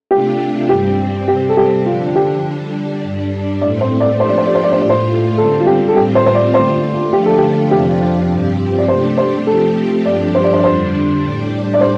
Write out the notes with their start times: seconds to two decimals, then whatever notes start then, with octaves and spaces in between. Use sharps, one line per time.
0.11 C3 A3 D4 F4 G4
0.69 G2 G3 C4 G4
1.28 C3 G3 C4 G4
1.49 A4
1.57 G4
1.86 D3 F3 D4 F4
2.16 G4
2.44 D3 G3 D4
3.03 G2 G3 D4
3.61 A2 A3 C4 D5
3.81 C5
4.00 D5
4.20 F3 A3 D4 G4 C5
4.29 D5
4.38 C5
4.46 D5
4.55 C5
4.64 D5
4.72 C5
4.79 A2 A3 F4 D5
4.90 C5
5.37 D3 G3 C4 A4
5.60 F4
5.66 G4
5.88 A4
5.95 A2 G3 C4 F4 G4
6.15 C5
6.26 C5
6.35 D5
6.54 D3 A3 F4 C5
7.13 D3 F3 A3 D4 F4 G4
7.26 A4
7.38 G4
7.71 F2 C3 F3 D4 F4 G4
8.30 G2 F3 C4 G4
8.78 D5
8.88 C3 A3 D4 G4 C5
9.18 C5
9.47 F3 A3 C4 G4 A4
10.05 G2 F3 D4 G4 D5
10.35 C5
10.44 D5
10.53 C5
10.59 D5
10.64 F2 D3 G3 D4 C5
11.22 A2 G3 D4 G4
11.74 D5
11.81 C5